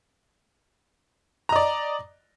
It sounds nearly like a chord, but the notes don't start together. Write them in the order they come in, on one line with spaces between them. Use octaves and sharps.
A#5 D#5 D5